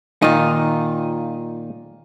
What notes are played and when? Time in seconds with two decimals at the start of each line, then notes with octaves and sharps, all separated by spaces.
0.22 A#2 D#3 D#4 F4